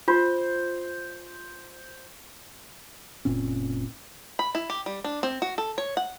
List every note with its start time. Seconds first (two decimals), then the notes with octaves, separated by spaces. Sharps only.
0.08 F4 C5
3.25 F#1 A#2 C4 C#4
4.39 B5
4.55 E4
4.70 G4
4.86 G3
5.04 D4
5.23 C4
5.42 F#4
5.58 A4
5.78 C#5
5.97 F#5